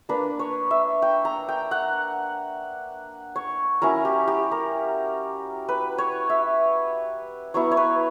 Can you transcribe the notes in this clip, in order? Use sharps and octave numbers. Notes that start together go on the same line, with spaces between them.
A#3 D4 B4
C#5
E5
G5
A#5
G5
F#5
C#5
F#3 C#4 E4 A#4
G4
G4
A#4
B4
C#5
E5
F#3 B3 E4 C#5
C#5
B4